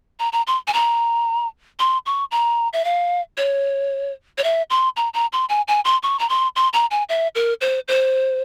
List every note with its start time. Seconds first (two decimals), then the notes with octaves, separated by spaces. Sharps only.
0.19 A#5
0.33 A#5
0.47 C6
0.67 G#5
0.73 A#5
1.79 C6
2.06 C#6
2.31 A#5
2.73 E5
2.85 F5
3.37 C#5
4.38 C#5
4.44 E5
4.70 C6
4.97 A#5
5.14 A#5
5.33 C6
5.49 G#5
5.68 G#5
5.85 C6
6.03 C#6
6.19 A#5
6.29 C6
6.56 C6
6.73 A#5
6.91 G#5
7.09 E5
7.35 A#4
7.61 C5
7.88 C5